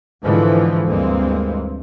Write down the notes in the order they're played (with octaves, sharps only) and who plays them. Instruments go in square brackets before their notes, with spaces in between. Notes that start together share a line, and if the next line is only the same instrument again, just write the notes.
[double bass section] G#2 D3 E3 F3
D2 G2 E3 G#3 A#3 C4